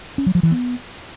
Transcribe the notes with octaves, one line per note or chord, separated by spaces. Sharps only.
C#4
F#3
F3
E3
B3